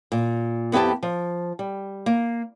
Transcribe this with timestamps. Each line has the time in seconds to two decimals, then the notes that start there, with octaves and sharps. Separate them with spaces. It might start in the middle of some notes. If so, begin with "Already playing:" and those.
0.12 A#2
0.72 F2 B3 E4 G4 A5
1.03 F3
1.59 G3
2.06 A#3